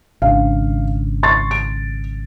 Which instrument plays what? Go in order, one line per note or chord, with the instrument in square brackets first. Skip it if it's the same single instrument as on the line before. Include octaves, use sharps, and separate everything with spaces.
[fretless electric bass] G#1 C#3 D4 [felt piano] F5
[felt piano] C6 C#6 A6
D7